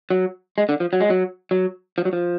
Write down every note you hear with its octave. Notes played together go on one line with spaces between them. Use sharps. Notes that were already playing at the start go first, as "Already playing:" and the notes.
F#3
G#3
D3
F3
F#3
G#3
F#3
F#3
F3
F#3
F3